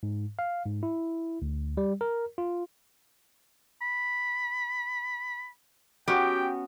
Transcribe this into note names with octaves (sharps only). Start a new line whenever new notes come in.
G#2
F5
G#2
E4
D2
G3
A#4
F4
B5
B3 C#4 F#4 G4 G5